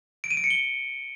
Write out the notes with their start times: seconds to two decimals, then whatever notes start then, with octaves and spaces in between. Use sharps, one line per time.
0.24 D7
0.31 D#7
0.37 D7
0.44 C#7
0.50 G7